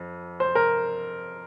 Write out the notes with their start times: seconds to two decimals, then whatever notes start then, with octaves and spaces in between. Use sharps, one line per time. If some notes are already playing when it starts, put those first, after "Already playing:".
Already playing: F2
0.40 C5
0.55 A#4